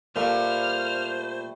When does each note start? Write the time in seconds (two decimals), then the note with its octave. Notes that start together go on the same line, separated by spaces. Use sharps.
0.16 A#2 G3 A3 C5 F6